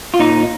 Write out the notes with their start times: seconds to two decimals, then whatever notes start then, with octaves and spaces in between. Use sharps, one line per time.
0.14 F4
0.19 A#2 D#4